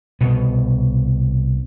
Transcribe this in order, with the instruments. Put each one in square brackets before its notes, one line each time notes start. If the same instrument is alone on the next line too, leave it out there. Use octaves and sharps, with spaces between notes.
[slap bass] C2 B2 B3